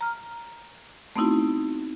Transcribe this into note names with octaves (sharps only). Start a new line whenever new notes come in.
A#5 F6
A3 B3 C4 D#4 E4 F#4